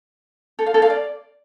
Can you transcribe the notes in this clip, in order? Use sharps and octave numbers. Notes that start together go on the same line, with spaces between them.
A4
F5
A4
F5
D5